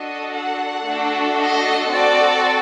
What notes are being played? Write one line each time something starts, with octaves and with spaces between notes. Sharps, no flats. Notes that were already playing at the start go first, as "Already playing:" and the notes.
Already playing: D4 F#4 A4 D#5
F#5
A3 D4 F#4 A4
D#5
C4 F#4 A4 D5